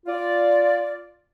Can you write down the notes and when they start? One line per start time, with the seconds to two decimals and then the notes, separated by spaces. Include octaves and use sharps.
0.06 F4 D5